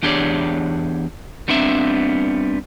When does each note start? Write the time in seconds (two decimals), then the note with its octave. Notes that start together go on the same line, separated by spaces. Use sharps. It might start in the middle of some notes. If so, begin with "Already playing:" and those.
0.03 E2 D4 G4 G#4 C#5 D5
1.48 G3 B3 C4 D4 E5